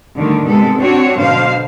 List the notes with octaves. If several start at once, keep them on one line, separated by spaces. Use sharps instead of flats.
D3 D#3 G3 A3 D4
C3 G#3 B3 A4
C4 D4 F#4 C#5
B2 D3 F#3 C5 F5